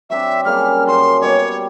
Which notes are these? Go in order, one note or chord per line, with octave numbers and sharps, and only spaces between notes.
F#3 C4 D4 E5
C#3 G3 A#3 F6
F#2 F#3 C6
B2 G3 G4 C#5